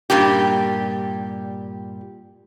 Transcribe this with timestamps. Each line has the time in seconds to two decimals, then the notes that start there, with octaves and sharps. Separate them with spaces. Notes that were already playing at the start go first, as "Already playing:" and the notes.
0.10 G2 A#2 G3 G4